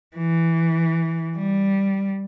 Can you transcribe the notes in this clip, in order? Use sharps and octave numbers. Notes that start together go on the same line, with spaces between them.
E3
G3